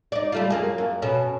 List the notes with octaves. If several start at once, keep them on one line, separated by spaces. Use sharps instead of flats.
D#4 D5
G3 A3 F4
F#2 A#3 G#4
F#2
B2 C#4 A4